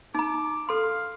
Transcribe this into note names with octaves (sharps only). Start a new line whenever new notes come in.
D#4 A#5 D6
A4 F5 C6